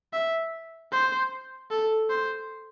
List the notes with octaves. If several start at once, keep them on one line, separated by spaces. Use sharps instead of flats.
E5
C5
A4
C5